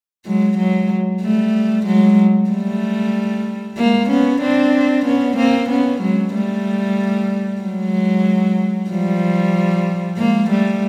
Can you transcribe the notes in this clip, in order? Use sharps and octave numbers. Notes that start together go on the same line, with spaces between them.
F#3 G#3
F#3 G#3
G3 A3
F#3 G#3
G3 A3
G#3 A#3
B3 C#4
C4 D4
B3 C#4
A#3 C4
B3 C#4
F#3 G#3
G3 A3
F#3 G#3
F3 G3
G#3 A#3
G3 A3